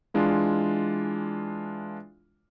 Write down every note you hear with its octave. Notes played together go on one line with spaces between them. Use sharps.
E3 G#3 D4 F4